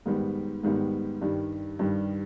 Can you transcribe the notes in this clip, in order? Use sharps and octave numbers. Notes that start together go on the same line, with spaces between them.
G#2 D#3 G3 B3
G#2 D#3 G3 B3
G2 D#3 G3
G2 D#3 G3